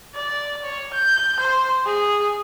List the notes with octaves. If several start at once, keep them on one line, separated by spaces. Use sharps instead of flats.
D5
C#5
G6
C5
G#4